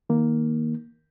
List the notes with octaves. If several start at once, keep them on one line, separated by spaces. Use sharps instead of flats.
D#3 A#3